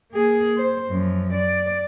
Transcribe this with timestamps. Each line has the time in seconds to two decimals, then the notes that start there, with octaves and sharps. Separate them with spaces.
0.11 A#3 G#4
0.58 C5
0.89 F#2 F3
1.33 D5